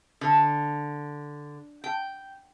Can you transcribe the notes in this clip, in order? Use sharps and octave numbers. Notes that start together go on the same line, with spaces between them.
D3
G5